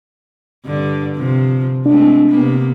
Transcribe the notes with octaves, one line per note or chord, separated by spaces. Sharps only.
G2 D3
C3 F3
G#3 A3 C4 D4
C3 A#3 B3